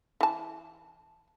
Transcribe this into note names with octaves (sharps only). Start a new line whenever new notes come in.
E3 A5